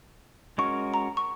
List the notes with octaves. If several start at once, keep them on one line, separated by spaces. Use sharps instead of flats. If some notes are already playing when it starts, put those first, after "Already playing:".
G#3 C#4 F#4 A#4 C#6
A#5
C#6